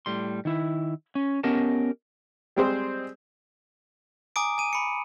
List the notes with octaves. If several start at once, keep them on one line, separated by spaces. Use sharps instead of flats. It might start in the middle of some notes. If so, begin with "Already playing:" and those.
A2 G3 C6
D#3 E4
C#4
B3 C#4 G4 A#4 D#5 A5
G3 G#3 C4 G#4 C5
G#5 A#5 D6 D#6 D7
G#5 D#7
B5 C#7